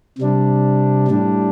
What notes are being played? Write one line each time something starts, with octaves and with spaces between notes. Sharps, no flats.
C3 G3 D4
A2 G3 D4